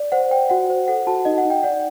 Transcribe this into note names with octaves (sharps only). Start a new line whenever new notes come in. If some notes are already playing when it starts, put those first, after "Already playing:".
Already playing: D5
C5 F#5
C5 G5
F#4 F#5
C5
A4 F#5
F#4 A5
D#4 D#5
F#5
D#4
G5
D5 F#5